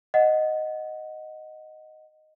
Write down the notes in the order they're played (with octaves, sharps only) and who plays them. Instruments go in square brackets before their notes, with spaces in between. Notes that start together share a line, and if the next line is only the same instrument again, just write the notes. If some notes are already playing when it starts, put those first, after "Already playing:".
[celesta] D#5 F#5